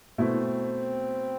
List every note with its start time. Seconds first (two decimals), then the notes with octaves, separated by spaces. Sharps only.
0.18 B2 A3 C4 E4